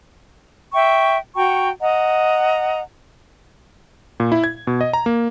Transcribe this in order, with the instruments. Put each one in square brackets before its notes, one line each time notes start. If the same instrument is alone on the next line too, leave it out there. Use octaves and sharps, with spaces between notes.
[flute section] E5 G5 C#6
F#4 G5 A#5 C#6
D#5 F#5 A#5
[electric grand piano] A#2
E4
G#6
B2
D#5
A#5
A#3